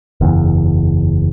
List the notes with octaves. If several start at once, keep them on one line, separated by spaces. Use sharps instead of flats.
F#1 E2